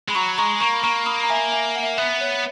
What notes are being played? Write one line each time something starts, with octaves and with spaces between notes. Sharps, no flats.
G#3 B5
F#3 A#5 C#6
G#3 A#5 C#6
A#3 A#5 C#6
B5
A#3 A#5 C#6
B5 D#6
A#5
E5 G#5
E5 G#5
F#5
E5
B3 E5
C#5